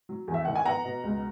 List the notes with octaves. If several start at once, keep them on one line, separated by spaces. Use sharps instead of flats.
F#3
E2
E5
D#3 F#5
G#5
B3 F#5 A#5
B2
C#2